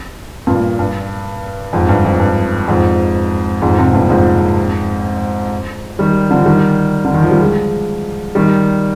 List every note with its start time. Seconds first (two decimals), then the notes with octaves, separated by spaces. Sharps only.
0.47 G2 A#2
0.79 G2
1.73 F2 G#2
1.89 G2
2.05 F2
2.20 G2
2.68 F2 G#2
3.62 F2 G#2
3.78 G#2 C3
3.93 G2 A#2
4.10 F2 G#2
5.99 D#3 G3
6.31 D3 F3
6.46 D#3 G3
7.05 D3
7.14 D#3
7.22 F3
7.31 G3
7.40 F3 G#3
8.35 D#3 G3